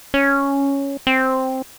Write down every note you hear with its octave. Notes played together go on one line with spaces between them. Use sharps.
C#4
C4